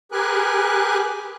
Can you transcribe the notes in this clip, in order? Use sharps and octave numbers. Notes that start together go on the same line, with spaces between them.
G4 G#4 A#4 B4 G#5 F#6